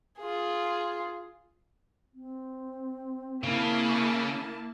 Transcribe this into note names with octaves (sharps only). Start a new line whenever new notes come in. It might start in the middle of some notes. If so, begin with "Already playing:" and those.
F4 G#4
C4
C#3 A#3 E4 A5